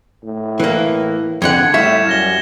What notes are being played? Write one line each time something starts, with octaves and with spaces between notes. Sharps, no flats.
A2
E3 A#3
F2 D3 F#5 G#6 C#7
A2 G3 E5 F5 C#6 E7
F#2 F6 A#6 G7